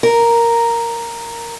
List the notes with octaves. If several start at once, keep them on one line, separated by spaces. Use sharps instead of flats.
A#4